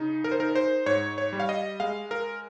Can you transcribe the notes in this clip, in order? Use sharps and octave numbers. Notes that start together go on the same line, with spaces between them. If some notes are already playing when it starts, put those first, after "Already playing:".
Already playing: C#3 D#4
A#4
C5
D#4 A#4
C5
G#2 C#5
C#5
G3
F5
D#5
G#3 F5
A#4